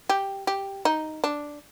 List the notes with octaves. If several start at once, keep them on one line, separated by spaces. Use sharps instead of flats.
G4
G4
D#4
D4